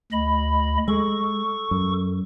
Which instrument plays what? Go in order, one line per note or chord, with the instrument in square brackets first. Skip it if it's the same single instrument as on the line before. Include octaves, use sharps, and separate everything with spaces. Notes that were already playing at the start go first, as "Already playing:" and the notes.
[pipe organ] D2 D#5 B5
[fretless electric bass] G#3 [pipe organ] A4 C#6
[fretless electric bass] F#2